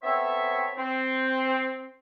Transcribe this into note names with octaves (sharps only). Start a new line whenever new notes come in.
B3 C4 A4 C#5 E5
C4